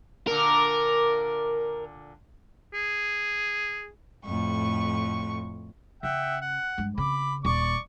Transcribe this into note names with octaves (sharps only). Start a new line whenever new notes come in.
A#2 D3 A#4
G#4
F2 A2 C#6
C#3 E5 F#5 G5
F#5
G2 G#3
C#3 C4 B5 D6
D#1 D5 C#6 D6